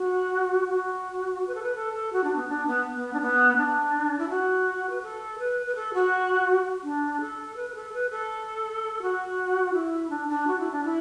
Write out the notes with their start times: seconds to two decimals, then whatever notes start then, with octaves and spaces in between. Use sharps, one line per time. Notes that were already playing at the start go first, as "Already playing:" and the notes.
Already playing: F#4
0.67 F#4
1.47 B4
1.54 A4
1.62 B4
1.75 A4
1.93 A4
2.12 F#4
2.23 D4
2.35 B3
2.48 D4
2.67 B3
2.93 B3
3.13 D4
3.21 B3
3.57 D4
4.18 E4
4.29 F#4
4.89 B4
5.02 A4
5.38 B4
5.66 B4
5.75 A4
5.93 F#4
6.83 D4
7.20 A4
7.56 B4
7.69 B4
7.74 A4
7.93 B4
8.10 A4
9.02 F#4
9.73 E4
10.09 D4
10.28 D4
10.47 F#4
10.58 E4
10.71 D4
10.84 E4